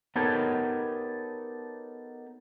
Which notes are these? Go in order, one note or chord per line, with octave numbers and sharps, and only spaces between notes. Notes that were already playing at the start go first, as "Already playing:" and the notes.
B3 D#4 G4 A4 A#4 C#5